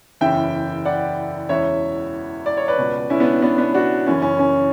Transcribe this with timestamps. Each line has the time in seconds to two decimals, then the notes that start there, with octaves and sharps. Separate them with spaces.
0.21 F#1 E2 C#3 E3 E5 G5
0.85 D5 F#5
1.49 E1 E2 C#3 C#5 E5
2.46 D5
2.57 C#5
2.68 B4 D5
2.78 C#2 B2
3.10 C#4 E4
3.20 B3 D4
3.42 B3 D4
3.58 B3 D4
3.74 D4 F#4
4.06 F#1 F#2 E3 C#4
4.22 C#4
4.39 C#4